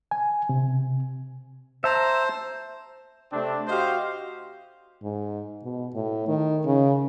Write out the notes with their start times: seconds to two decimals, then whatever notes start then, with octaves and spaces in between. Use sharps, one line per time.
0.11 G#5
0.49 C3
1.84 C5 E5 A5 A#5
3.32 C3 A3 C4 D4
3.68 F#4 G4 C5 D#5 F5
5.02 G#2
5.64 B2
5.94 A2
6.28 D#3
6.66 C#3